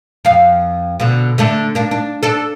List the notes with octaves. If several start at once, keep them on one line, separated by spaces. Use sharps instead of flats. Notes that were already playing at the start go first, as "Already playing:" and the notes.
F2 F5
B2 D3
D3 A3 D4
A#3 D4
D4
D4 A4